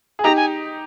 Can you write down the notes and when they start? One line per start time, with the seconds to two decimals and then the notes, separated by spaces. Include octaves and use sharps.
0.19 G#4
0.24 D#4 G4 A#5
0.37 G#5